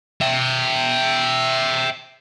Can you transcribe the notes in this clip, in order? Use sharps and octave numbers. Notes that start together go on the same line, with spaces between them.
E5 G5